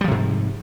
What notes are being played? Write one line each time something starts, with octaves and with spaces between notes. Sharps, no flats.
G#2 C3 F3 G3